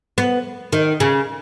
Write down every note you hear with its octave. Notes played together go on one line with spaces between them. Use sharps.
B3
D#3
C#3